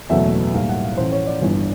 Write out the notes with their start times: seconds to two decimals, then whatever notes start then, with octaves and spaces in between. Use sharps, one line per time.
0.09 F#1 E2 B2 F#3 A3 E5
0.54 B1 A2 E3 G3 A#3 F5
0.69 F#5
0.84 F5
0.97 A1 A2 F3 C5
1.12 C#5
1.27 D5
1.42 G1 G2 E3